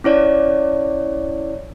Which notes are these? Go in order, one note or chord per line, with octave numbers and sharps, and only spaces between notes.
C#4 E4 C#5 D5